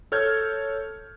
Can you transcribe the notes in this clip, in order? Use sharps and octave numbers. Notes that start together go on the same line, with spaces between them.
A4 C#5 F6 G6 G#6